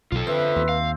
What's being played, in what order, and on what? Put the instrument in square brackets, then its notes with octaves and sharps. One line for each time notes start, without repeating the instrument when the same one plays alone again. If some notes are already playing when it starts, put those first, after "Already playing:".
[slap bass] B1 B2 [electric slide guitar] F4 A4
[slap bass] D3 D#3 [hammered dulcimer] C4 E5 [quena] B4
[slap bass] D#2
[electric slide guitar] F5